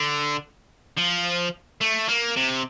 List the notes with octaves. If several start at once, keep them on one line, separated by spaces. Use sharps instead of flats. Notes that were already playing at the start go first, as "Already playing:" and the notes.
Already playing: D3
F3
A3
A#3
C3